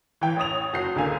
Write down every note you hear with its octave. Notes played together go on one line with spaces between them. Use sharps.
E3 G5
A1 C#5 D#6 F7
F#1 F#4 G6 C7
C#2 D3 A#3 F5 G#5